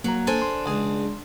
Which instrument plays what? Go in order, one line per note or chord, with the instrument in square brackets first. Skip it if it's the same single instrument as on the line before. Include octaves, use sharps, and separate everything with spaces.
[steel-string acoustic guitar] F#3 [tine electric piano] A#3 A#5
[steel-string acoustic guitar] D4 [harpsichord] A4 C5 G#5
[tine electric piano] C6
[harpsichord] C#2 G#4